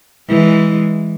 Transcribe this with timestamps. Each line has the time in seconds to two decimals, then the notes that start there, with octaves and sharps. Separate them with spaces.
0.29 E3 G#3